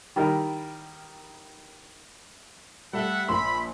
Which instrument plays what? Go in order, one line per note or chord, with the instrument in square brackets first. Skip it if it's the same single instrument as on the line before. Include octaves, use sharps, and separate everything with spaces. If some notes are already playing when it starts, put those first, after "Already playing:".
[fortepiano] D#3 G3 E4 A#4
[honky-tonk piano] G3 A3 [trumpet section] A4 E5 F#5
[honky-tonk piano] A#1 C6 E6 [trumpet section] B5